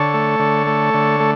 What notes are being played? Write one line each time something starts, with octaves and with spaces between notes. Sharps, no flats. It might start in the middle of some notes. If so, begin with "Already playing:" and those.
Already playing: D3 A4 C#5
A3
D3
A3
D3
A3